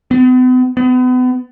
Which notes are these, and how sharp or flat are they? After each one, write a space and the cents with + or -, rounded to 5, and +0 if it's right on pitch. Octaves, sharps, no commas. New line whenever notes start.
B3 +45
B3 +35